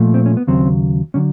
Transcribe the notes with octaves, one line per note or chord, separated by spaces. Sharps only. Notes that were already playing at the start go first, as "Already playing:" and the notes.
Already playing: A#2 F3 A3
C4
C#4
B3
D#2 C#3 F#3 C4
D3 F#3 C#4